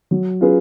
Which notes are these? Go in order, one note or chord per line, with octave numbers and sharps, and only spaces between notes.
F#3
C#4 F4 G#4 B4